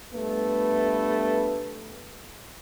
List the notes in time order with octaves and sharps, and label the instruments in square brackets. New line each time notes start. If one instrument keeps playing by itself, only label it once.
[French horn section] G2 A3 B3 B4